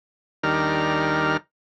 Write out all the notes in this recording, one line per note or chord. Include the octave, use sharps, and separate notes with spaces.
D#2 D#3 G3 D4 A#4 F6